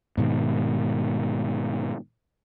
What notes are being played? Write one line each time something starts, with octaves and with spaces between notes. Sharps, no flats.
G#2 B2 D#3